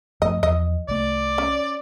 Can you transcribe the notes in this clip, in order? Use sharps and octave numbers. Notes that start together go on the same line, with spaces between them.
F#2 F3 A3 D#5
E2 F3 D#5
C2 A3 D5
C#4